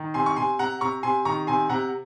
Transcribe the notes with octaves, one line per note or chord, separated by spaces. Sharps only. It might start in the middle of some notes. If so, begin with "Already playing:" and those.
Already playing: D#3
C3 G#5 C6
C#6
C3 G#5 C6
C3 F#5 A#5
C3 A#5 C#6
C3 G#5 C6
D#3 A#5 C#6
C3 G#5 C6
C3 F#5 A#5